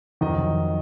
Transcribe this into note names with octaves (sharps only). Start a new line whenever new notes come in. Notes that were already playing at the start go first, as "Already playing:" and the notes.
F2 D#3 F#3 D#5